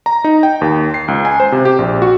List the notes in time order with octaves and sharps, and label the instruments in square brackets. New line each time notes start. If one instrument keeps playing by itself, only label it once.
[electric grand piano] A#5
D#4
G5
D#2
C7
C#2
G#5
C5
C3
G4
A#1
F#4